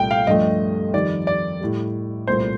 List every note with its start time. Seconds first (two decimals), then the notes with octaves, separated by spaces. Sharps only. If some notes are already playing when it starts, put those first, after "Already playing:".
Already playing: C2 A#2 A3 G5
0.11 F5
0.27 G2 F3 A3 D#5
0.94 F2 D#3 G3 D5
1.27 D5
1.61 A2 G3
2.27 C2 A#2 A3 C5